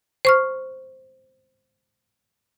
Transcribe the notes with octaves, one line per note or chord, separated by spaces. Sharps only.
C5 C#6 F6